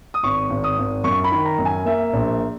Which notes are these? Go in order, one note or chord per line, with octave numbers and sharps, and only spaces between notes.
D#6
G#1 C#6
G#1
D#6
G#1
F#2 C#6
B5
D#3
A#5
F#2
G#5
A#3 E5
A#1